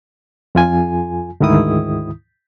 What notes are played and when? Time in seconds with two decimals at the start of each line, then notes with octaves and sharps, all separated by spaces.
0.55 F2 F4 G#5
1.40 D2 G#2 D#3 E4 D#6